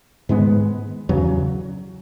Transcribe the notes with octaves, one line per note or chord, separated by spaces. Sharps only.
G#2 D#3 G#3 B3
E2 C#3 F#3